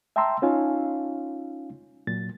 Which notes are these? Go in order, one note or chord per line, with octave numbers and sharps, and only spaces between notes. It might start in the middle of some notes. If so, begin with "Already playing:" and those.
E5 G5 A5 A#5 C6 E6
C#4 D#4 F4 C#5 F5 G#5
A#2 F#3 A6